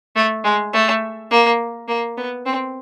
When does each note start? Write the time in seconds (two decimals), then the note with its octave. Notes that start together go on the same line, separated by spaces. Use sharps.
0.16 A3
0.44 G#3
0.73 A3
1.31 A#3
1.88 A#3
2.17 B3
2.46 C4